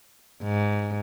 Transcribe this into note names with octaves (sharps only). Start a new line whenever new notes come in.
G#2